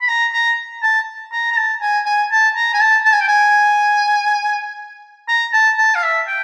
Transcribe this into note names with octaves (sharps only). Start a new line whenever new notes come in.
B5
A#5
A#5
A5
A#5
A#5
A5
G#5
G#5
A5
A#5
G#5
A5
A5
G#5
G5
G#5
A#5
A5
A5
F5
E5
G5